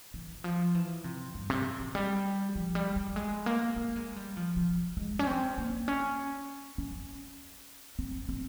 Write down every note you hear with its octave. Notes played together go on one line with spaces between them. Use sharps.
E3
F3
E3
C3
G2
C3
E3
G3
F3
G3
G3
G#3
A#3
A#3
G#3
G3
F3
F3
G#3
C#4
C4
A#3
C#4
C#4
C4
C4